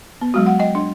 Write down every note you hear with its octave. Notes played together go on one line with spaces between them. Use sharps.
B3
F#3 G#3 F#4
F#5
D#5 G5
D4